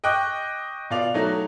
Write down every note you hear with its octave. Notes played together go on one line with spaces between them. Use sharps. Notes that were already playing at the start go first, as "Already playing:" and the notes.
D#5 G5 C#6 D6 F#6
B2 F4 D5 F7
F#3 A3 D#4 F#4